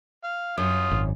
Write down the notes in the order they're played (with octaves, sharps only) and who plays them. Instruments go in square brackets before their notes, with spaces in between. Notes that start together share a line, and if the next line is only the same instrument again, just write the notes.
[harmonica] F5
[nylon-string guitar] F#2 [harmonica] F4 D#6
[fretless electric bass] G#1